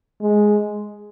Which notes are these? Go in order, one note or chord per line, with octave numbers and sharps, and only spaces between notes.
G#3